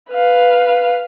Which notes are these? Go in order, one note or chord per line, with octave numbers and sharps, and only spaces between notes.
B4 F5